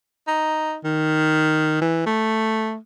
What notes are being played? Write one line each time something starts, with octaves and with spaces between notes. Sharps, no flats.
D#4
D#3
E3
A3